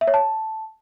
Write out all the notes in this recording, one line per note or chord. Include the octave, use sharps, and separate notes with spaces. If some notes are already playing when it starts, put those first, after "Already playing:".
E5
C#5
A5